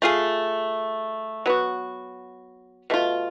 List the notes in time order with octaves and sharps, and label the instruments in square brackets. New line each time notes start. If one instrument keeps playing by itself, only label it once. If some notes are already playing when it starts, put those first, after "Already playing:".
[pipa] A3 F4 G#4
F#3 B3 F#4
B2 A3 F4